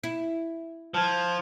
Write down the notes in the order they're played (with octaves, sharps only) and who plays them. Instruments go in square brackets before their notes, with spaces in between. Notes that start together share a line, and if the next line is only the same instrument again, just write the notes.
[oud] E4
[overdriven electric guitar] F3 [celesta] A5 G#6